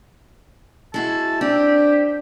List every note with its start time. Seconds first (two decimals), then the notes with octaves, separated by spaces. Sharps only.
0.94 G#3 E4 F#4 A5
1.41 C4 D4 G4